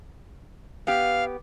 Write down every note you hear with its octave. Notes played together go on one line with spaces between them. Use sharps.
B3 G4 F5